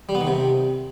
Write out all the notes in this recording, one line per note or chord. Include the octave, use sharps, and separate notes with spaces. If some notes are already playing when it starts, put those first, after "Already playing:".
G3
B3
D#3
C3